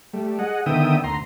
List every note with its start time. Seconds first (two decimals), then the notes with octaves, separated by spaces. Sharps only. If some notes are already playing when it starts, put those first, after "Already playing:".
0.13 G3 A3
0.39 G#4 D#5 F#5
0.66 D3 D#3 B3 E5 G5 D#6
1.04 D2 A#5 C6